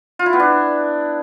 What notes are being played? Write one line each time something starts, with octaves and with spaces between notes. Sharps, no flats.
F4
E4
B3
D4